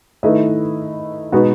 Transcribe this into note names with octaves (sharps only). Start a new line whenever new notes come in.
D#3 A3 E4 B4 D#5
B2 G#3 B3 D#4 F#4